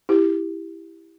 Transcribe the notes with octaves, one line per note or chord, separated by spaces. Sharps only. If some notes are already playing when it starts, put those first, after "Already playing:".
E4 G4